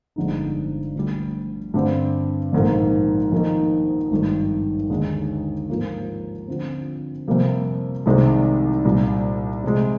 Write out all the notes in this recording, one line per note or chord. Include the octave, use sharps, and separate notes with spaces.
G1 F2 D3 G#3 D#4
D2 D3 G3
G2 D3 G3 C4
A#1 G#2 D#3 A#3
F2 D#3 A#3 D#4
G#1 G2 D#3 G3
D#2 D3 G#3 D#4
G#2 F3 A#3
D3 F3 C4
F2 C3 G3 A#3
C2 C3 D#3 G#3
C2 A#2 G3
C3 F3 G#3